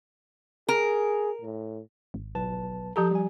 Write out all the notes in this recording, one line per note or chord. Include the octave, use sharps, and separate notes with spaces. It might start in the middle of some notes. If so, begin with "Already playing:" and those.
G#4 A#4
A2
G#1
B1 B4 A5
F3 G4 A4 A5 A#5 G6
G3 G#5